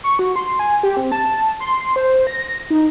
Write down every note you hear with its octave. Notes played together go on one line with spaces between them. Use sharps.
C#6
F#4
C6
G#5
G4
C4
A5
C6
C5
A#6
D#4